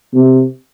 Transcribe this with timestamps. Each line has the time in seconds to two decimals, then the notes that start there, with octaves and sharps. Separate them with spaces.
0.15 C3